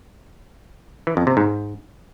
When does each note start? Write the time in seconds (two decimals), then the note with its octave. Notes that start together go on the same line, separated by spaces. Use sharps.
1.07 E3
1.17 F2
1.27 C3
1.37 G#2